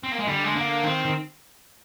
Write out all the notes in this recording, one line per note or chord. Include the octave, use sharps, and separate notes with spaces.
C4
A#3
G#3
D3 G3
G#3
D3 A#3
D#3 C4
D#3